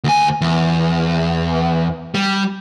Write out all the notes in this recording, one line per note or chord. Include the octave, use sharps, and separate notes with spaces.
D2 G#5
E2
G3